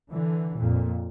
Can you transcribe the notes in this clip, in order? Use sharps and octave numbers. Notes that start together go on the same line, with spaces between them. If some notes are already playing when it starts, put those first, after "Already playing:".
D3 E3
F2 A#2